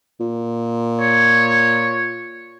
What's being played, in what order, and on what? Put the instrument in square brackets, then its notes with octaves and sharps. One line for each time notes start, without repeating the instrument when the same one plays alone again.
[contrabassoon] A#2
[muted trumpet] C#5